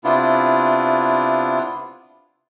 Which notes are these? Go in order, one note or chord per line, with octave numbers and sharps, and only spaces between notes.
C3 B3 D4 E4 F4